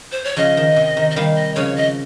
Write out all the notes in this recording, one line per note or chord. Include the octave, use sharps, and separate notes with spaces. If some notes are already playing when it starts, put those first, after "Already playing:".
C5
C#5
C#3 F3 D#5
D#3
C3
D#3
D#5
D#3 G3 F5
D#5
C#3 F3 C#5
D#5